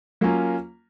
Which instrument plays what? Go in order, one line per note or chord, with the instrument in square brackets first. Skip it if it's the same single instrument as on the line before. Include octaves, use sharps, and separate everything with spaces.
[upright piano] F#3 A#3 C#4 F4